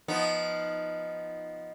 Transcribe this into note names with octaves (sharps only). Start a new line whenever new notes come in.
F3 B3 D#4